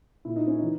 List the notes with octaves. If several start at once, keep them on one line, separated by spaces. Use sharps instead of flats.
A#2 E4
D#4
C#4
E3 D#4